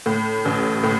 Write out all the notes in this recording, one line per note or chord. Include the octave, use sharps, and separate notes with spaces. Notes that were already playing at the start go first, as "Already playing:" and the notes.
A2
A1
A2